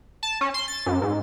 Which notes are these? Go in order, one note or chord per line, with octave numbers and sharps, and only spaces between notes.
A5
C#4
C6
A6
F#2
G#2